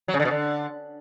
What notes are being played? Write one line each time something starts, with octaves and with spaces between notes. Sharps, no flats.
F#3
C#3
D3
B2
D3